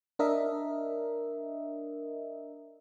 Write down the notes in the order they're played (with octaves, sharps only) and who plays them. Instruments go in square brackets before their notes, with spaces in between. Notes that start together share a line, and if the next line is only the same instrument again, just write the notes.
[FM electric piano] D4 A#4 D#5 E5